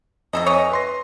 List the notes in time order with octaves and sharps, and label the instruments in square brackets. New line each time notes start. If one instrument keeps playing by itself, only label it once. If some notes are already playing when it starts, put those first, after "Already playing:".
[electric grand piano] F2 [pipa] F#3 A4 D#5
[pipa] E3 C#5 D#5
[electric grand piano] A#6
B4 C6 A#6